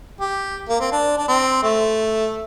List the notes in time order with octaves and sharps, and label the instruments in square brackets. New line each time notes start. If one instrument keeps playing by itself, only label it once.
[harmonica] G4
A#3
C4
D4
D4
C4
A3